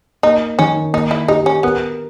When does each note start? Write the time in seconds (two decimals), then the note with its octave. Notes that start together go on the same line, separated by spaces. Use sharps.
0.23 A#3 D#4
0.59 D#3 C#4
0.93 A#3 D#4
1.11 E4
1.28 D#4 G4
1.46 C#4
1.63 B3 A#4